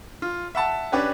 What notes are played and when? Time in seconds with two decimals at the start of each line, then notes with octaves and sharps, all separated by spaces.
0.22 F4
0.55 E5 F#5 A5
0.92 C#4 D4 G4 B4 C#5